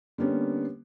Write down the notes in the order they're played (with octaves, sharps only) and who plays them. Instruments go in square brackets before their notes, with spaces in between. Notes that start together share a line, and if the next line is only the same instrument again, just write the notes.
[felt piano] D3 G3 A#3 B3 C#4